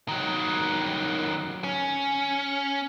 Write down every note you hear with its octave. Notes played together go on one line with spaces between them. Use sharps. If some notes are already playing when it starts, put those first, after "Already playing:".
D#3 F#3
C#4